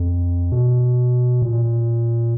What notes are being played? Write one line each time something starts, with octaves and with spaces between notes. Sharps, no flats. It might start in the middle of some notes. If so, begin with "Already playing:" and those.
Already playing: F2
B2
A#2